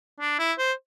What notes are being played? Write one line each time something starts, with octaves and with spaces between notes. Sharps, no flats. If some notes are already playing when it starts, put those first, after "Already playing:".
D4
E4
C5